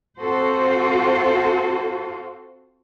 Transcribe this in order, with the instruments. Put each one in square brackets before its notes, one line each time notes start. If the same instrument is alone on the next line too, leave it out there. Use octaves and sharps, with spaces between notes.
[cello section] C4 F4 F#4 A4 C5